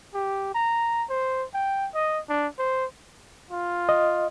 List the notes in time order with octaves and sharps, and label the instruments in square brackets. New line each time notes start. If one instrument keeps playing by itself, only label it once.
[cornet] G4
A#5
C5
G5
D#5
D4
C5
[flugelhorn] F4
[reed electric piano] D#5